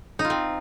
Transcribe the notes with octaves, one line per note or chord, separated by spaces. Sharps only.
D#4
F4
C4